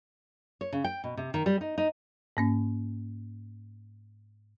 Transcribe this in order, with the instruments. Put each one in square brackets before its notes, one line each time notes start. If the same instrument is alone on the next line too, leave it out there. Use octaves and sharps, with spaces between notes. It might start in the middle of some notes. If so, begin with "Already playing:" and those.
[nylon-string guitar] C#5
C#3
G5
B2
C3
D#3
G3
D#4
D#4
[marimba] G#2 A#3 C#4